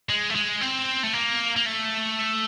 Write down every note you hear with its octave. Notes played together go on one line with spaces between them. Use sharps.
G#3
A3
G#3
C4
A3
A#3
A#3
A3